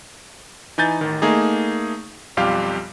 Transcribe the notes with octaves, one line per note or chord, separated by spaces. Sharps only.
E3 D#4 G#5 G6 A6
A1 D#3
A3 A#3 D#4 G#4
B1 F2 G3 F4 G4 F5